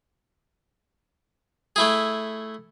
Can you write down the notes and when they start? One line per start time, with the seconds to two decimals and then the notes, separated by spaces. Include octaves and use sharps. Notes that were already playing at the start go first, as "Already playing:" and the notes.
1.76 A3 E4 G#4